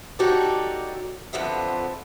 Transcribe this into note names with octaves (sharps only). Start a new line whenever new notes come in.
D#4 F#4 G4 A4 C#5 D5
F2 D3 F3 B3 E5